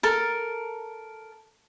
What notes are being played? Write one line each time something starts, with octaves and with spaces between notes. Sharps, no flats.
A4 A#4